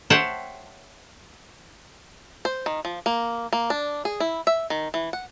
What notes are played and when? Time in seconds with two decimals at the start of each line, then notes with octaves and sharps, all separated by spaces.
0.10 C5 C#5 E5 F#5 G5 A5
2.45 C5
2.66 D#3
2.85 F3
3.06 A#3
3.53 A#3
3.70 D4
4.05 G#4
4.20 E4
4.47 E5
4.70 D#3
4.94 E3
5.13 F#5